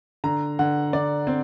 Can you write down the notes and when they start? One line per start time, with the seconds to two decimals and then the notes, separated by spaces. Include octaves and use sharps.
0.24 D3 A#5
0.59 D3 F#5
0.93 D3 D5
1.27 C4 C5